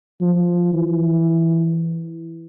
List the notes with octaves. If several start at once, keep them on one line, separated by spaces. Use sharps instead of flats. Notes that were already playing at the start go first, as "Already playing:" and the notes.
F3
E3